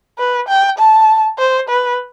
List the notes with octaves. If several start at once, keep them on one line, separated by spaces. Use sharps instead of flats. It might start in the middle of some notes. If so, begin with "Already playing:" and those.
B4
G5
A5
C5
B4